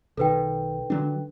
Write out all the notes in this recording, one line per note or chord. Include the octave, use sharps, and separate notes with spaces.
B1 D#3 A4 B4 G5
D3 F#3 D4